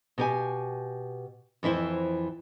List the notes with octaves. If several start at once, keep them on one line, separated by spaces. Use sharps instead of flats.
B2 G4 G#5
F2 E3 E4 C5